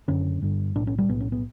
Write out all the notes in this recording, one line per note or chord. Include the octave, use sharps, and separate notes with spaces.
F#1 F#2 D3 C#4
G1 G2 D3
B1 A2 D4
C#4
G3
B1 A2 B3
C#4
B3